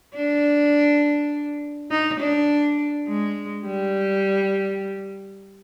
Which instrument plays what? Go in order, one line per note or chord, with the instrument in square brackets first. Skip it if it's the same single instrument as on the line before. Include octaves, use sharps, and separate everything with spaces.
[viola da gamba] D4
D#4
D4
G#3
G3